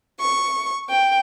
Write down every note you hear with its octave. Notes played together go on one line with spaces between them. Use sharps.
C#6
G5